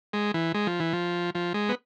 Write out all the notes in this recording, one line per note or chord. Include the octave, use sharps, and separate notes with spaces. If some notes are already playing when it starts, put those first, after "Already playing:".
G#3
E3
G#3
F3
E3
F3
F3
G#3
B3